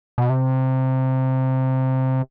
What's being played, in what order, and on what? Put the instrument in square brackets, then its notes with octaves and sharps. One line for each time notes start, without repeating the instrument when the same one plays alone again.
[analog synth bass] B2
C3